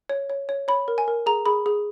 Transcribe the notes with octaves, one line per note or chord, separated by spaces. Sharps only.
C#5
C#5
C#5
C#5 B5
A#4
G#5
A#4
G#4 A#5
G#4 B5
G#4